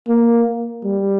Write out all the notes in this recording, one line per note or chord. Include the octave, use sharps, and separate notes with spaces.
A#3
G3